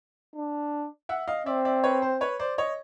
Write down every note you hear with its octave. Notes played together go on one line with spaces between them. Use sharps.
D4
E5 F#5
D#5 F5
C4 D5 E5
D5 E5
B4 C#5
C5
B4 C#5
C5 D5
C#5 D#5